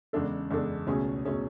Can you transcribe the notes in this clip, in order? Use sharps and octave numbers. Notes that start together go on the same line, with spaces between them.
E2 C#3 G#3 D4 A4
E2 C#3 G#3 D4 A4
C#2 B2 A3 C#4 G#4
B2 A3 C#4 G#4